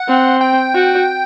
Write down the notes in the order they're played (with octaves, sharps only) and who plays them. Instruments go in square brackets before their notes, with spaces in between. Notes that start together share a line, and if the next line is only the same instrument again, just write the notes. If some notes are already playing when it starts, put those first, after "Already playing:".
Already playing: [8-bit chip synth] F#5
[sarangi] C4
[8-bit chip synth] G5
[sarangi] F#4